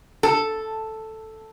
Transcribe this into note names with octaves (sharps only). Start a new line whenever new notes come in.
A4